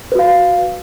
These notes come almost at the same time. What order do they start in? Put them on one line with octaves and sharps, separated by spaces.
B4 F#4 F5